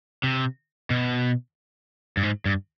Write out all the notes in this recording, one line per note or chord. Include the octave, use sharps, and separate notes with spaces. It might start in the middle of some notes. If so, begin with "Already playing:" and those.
C3
B2
G2
G#2
G2